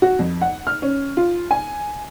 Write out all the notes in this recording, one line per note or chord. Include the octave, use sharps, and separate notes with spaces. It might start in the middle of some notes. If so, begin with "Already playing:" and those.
F#4
F2
F#5
F6
C#4
F4
G#5